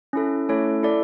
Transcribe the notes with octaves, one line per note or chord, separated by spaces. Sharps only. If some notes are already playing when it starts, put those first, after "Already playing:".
C#4 E4 A4
A3 C#4 E4 A4 C#5
E4 A4 D5